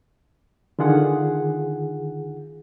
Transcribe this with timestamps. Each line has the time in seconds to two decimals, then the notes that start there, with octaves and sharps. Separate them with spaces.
0.79 D3 D#3 F4 G#4 F#5